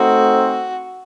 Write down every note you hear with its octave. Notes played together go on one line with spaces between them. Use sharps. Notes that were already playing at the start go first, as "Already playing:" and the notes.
Already playing: A3 C4 D#4 F#4